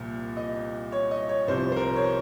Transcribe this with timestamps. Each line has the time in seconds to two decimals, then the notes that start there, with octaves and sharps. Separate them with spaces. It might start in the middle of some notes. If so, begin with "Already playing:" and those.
Already playing: C2 A#2 F3
0.37 D#5
0.92 C#5
1.11 D#5
1.29 C#5
1.48 C2 C3 F3 C5
1.72 C5
1.76 A#4
1.96 C#5
2.04 C5